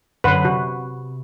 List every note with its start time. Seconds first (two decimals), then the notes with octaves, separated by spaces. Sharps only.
0.24 F#2 D3 F#3 B4 F#5 C6
0.45 C3 F#4